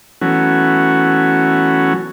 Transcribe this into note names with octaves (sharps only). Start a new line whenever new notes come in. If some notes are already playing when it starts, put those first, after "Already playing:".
E3 F#3 A3 B3 C#4 F#4